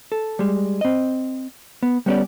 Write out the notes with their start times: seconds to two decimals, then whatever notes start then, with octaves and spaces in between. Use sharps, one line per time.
0.12 A4
0.39 G3 G#3
0.81 C4 D#5
1.83 B3
2.06 G3 B3 C#4 G4 D5